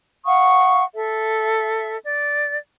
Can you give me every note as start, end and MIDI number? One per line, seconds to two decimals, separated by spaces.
0.25 0.83 77
0.25 0.83 78
0.25 0.83 85
0.25 0.83 87
0.94 1.96 69
0.94 1.96 76
2.04 2.58 74